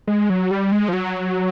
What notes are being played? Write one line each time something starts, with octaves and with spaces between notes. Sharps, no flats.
G#3
F#3
G3
G#3
F3
F#3